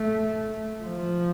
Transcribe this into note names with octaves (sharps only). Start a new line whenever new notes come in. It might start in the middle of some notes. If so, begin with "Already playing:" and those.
Already playing: A3
F3